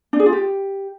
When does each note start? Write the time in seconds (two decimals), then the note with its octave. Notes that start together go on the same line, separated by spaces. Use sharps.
0.13 D4
0.19 G#4
0.26 F4
0.33 G4